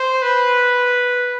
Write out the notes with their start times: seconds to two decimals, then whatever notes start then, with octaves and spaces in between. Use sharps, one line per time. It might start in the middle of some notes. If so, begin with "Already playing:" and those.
Already playing: C5
0.22 B4